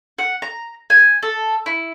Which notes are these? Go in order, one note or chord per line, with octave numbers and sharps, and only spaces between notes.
F#5
A#5
G#5
A4
E4